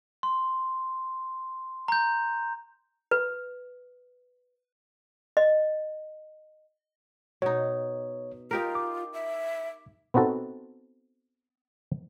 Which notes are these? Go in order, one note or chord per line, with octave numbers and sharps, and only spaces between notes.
C6
A#5 G6
B4
D#5
B2 D#4 C#5
D#4 F4 G4 A#4
D6
E5
B3 C4 D#4 F#4 A4